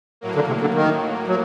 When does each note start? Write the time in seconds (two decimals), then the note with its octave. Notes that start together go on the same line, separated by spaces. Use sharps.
0.21 A2 F#3 A#3
0.35 D3
0.47 C3
0.61 D3
0.74 D#3
1.28 F#3